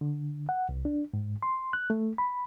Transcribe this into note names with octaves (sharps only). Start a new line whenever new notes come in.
D3
F#5
C2
D4
G#2
C6
F#6
A3
B5